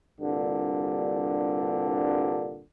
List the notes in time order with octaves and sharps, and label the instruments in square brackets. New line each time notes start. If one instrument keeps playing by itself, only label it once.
[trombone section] C2 G2 A#2 D3